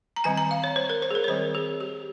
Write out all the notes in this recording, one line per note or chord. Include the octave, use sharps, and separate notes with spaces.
A#5
D#3 G3 C4 G#5
A#5
F5
C#5
C5
A#4
C5
G#4
A#4
C#5
D#3 G3 C4 C5
G#4
G4